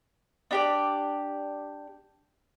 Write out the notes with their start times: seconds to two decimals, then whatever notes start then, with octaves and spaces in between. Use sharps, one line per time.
0.51 D4 G4 D5